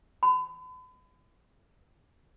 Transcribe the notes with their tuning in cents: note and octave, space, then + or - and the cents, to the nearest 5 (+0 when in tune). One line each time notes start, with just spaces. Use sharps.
B5 +40